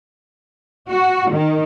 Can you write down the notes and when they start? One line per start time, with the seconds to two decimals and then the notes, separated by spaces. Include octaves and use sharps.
0.90 F#4
1.32 D#3